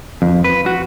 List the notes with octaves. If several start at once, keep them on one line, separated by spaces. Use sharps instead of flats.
F2
B4
F#4